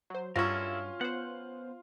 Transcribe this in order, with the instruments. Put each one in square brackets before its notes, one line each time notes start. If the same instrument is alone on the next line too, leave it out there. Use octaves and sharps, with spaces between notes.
[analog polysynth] F#3 C5
[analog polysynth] G2 [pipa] F#3 C#4 [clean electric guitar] E4 A4 A#4 [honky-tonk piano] F4
[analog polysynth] B3 C5 [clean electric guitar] F#5